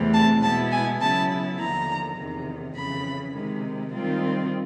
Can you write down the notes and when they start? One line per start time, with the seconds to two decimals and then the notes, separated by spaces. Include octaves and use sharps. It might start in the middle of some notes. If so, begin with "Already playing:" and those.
Already playing: E2 C3 E3 A3 C4
0.13 A5
0.42 B2 G#3 B3 E4 A5
0.71 G#5
1.00 C#3 F#3 B3 E4 A5
1.58 D#2 D3 F3 A#5
2.17 E2 C3 D#3
2.75 F2 C#3 E3 B5
3.33 C3 D#3 G#3
3.91 D#3 G3 C4 F4